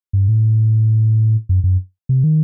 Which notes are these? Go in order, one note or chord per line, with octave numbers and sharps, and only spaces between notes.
G2
A2
F#2
F#2
C3
D#3